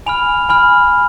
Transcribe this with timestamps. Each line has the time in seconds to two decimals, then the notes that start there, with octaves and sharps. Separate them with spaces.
0.06 G#5 B5 F6 F7
0.49 G#5 B5 F6